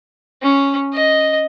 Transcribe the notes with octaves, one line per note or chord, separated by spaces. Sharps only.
C#4
D#5